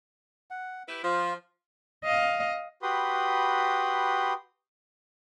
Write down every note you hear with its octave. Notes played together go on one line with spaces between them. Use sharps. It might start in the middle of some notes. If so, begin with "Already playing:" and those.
F#5
E4 G4 B4
F3 F4
D#5 F5
F#4 G4 B4 B5 C6 D#6